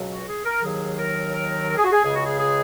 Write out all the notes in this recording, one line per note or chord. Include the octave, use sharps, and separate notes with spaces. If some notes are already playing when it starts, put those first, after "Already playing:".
Already playing: C#2 B2 F#3
F#4
G#4
A#4
D#2 D#3 F#3 G#4
A#4
A#4
A#4
G#4
F#4
G#4
C#2 C#3 G#3 G#4
F#4
G#4
G#4